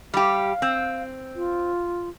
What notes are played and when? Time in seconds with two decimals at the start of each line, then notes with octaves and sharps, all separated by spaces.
0.14 G3 G4 F5
0.62 C4
1.36 F4